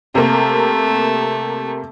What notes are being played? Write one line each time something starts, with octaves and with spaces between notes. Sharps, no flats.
C3 A3 A#3